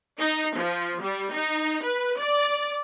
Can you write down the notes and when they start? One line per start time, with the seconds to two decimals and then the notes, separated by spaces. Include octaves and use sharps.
0.19 D#4
0.57 F3
1.02 G3
1.33 D#4
1.84 B4
2.18 D5